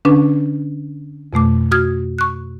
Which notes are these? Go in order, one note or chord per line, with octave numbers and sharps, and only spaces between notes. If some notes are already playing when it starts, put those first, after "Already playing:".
D3 C#4 D4 B4
F2 B2 A3 D6
F#4 D#6 F6 G#6
C#6 F#6